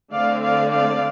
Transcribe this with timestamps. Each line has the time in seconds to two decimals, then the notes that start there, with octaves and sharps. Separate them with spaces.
0.13 D3 A3 C4 D5 F5
0.42 D5 F5
0.72 D5 F5